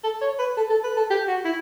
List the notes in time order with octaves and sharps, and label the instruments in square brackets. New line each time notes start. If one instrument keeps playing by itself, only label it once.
[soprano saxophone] A4
C#5
B4
A4
A4
B4
A4
G4
F#4
E4